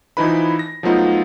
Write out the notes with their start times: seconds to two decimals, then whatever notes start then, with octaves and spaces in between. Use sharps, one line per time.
0.17 E3 F3 D#4 E4 B4 B5
0.59 A#6
0.83 F3 F#3 A3 B3 D#4 F4